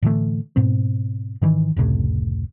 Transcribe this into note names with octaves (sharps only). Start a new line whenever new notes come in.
A2 D3 E3 A3
G#2 B2 C4
G#2 D#3 E3
F1 C#2 A2 C3